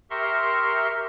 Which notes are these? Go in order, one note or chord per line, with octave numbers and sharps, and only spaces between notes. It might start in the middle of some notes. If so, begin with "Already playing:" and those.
G4 A#4 E5 A#5 C6 C#6